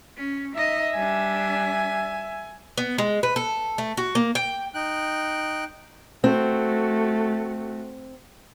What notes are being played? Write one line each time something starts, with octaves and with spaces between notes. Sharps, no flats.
C#4
D#4 D#5 E5
G3 D4 G#5
B3
G#3
B4
A4
A3
F#4
A#3
G5
D#4 G5 F#6
A3 C4 F#4